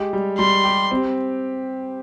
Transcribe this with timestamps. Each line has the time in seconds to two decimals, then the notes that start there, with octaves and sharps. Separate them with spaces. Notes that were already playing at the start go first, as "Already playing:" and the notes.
Already playing: G#3 G4
0.13 G3
0.39 G3 C6
0.64 G4
0.91 C4